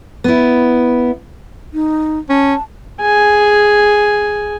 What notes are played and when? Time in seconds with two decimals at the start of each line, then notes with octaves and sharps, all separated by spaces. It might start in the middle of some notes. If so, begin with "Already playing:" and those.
0.24 B3 E4
1.74 D#4
2.29 C#4 A5
3.01 G#4 G#5